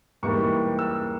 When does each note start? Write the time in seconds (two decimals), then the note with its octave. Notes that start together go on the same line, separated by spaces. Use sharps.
0.23 G#2 E3 G3 A#3 C#6
0.79 E6